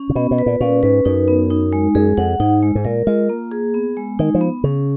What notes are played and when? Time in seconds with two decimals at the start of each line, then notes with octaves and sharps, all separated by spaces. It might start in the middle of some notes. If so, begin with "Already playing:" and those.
Already playing: C#4
0.09 C#3
0.15 B2 B3
0.31 B2
0.38 B4
0.46 A#2
0.60 A#2 C#4
0.83 G#2 B4
1.05 F#2 D#4
1.28 B3
1.51 D#4
1.73 G#3
1.95 F#2 G#4
2.17 F2 F#5
2.40 G#2 D#4
2.63 G#3
2.75 G#2
2.85 A#2 A#4
3.07 G#3 F4
3.29 A#3
3.51 G#4
3.74 B3
3.97 G#3
4.19 D#3 D#4
4.34 F3
4.41 B3
4.64 C#3 C#4